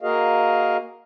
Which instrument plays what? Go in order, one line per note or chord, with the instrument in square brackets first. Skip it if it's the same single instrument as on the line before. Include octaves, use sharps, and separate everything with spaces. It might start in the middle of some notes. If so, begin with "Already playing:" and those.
[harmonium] A#3 F#4 G#4 A#4 D#5 F5